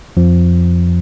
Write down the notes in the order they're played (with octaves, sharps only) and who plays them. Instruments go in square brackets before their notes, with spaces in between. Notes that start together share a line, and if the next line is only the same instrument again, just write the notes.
[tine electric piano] F2 F3